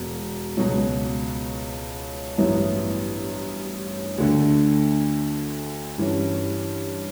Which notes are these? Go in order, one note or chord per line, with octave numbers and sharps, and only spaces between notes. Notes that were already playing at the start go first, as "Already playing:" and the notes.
Already playing: E1
C#2 B2 F#3
A1 G2 F#3 B3 E4
D2 D3 A3
G2 E3 G3 C#4